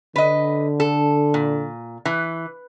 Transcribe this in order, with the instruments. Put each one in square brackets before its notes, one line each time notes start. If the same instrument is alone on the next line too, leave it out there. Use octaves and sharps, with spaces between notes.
[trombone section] D3 [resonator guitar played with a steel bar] B4 D#5
[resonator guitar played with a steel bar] A4
A#2
E3